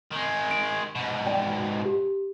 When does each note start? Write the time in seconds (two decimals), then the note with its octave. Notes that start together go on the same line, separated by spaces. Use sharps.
0.11 D#3 G#3
0.51 D7
0.96 G#2 B2
1.26 D5 G5
1.86 G4